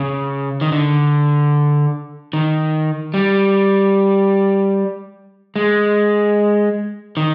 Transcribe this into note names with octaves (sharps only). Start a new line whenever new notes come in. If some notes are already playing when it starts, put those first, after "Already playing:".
Already playing: C#3
D#3
D3
D#3
G3
G#3
D#3